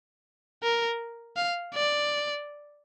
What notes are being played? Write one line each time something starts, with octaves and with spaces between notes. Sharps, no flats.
A#4
F5
D5